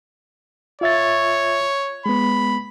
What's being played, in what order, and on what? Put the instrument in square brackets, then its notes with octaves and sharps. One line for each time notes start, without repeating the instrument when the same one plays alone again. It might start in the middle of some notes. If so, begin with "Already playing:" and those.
[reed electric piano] F4 E5 A6 [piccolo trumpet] C#5
[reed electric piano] G#3 B3 [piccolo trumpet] B5